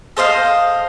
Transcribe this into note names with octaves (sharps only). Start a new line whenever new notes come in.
A4 C5 D#5 F5